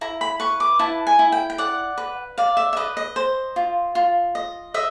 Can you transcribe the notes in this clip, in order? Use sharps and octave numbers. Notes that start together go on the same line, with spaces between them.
E4 A#5
B5
B4 C#6
D6
E4 A5
G#5
E4
G5
G5
D5 F#5
B4
D5 F5
E5
E5
B4 D#5
D#5
C5
F4
F4
D#5
D#5 E5